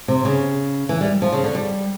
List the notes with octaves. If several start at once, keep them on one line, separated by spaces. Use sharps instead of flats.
C3
C#3
E3
G3
F3
C#3
D3
G3